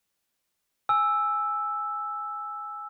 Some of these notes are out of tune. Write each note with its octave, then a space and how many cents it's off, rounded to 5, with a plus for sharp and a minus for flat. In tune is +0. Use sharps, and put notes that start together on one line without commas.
G#5 +0 E6 +0